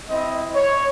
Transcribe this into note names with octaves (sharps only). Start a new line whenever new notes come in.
C4 E4 D#5
C#5